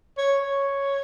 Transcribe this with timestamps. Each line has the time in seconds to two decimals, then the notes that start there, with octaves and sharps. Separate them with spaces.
0.18 C#5
0.42 C#5